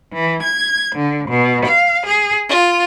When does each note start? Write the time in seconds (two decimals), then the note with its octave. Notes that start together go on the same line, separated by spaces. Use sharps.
0.14 E3
0.44 G#6
0.96 D3
1.31 B2
1.66 F5
2.07 G#4
2.49 F4